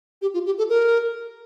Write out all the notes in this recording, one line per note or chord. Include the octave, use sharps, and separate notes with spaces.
G4
F4
G4
A4
A#4